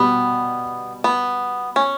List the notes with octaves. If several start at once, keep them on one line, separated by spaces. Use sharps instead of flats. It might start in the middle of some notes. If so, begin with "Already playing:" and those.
Already playing: B2 G3 B3
B3
C#4